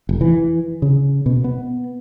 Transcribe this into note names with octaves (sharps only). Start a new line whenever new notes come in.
F1
E3
C#3
B2
B3